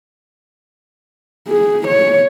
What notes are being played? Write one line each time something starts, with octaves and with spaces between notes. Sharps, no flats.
G#4
C#5